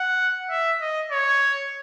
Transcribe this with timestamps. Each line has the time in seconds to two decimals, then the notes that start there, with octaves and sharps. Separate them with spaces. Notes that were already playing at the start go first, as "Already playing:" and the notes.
Already playing: F#5
0.50 E5
0.81 D#5
1.11 C#5